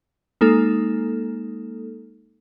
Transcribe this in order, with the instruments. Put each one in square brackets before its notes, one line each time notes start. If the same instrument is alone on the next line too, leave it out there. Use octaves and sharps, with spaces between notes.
[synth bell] G#3 A#3 D#4 A4